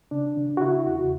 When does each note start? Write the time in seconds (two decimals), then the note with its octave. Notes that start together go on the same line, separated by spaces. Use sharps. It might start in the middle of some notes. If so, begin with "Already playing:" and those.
0.11 C#3 D4
0.37 C#3
0.57 F#4
0.62 C#3 E4
0.87 E2 F#4